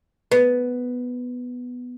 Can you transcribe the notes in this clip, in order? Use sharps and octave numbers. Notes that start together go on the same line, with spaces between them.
B3